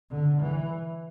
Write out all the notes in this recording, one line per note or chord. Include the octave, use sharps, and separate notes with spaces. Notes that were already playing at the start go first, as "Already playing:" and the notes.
D3
E3